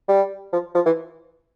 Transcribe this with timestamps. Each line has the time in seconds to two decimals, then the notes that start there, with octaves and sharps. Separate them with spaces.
0.09 G3
0.52 F3
0.75 F3
0.86 E3